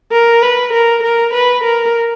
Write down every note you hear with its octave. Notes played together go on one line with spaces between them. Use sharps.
A#4
B4
A#4
A#4
B4
A#4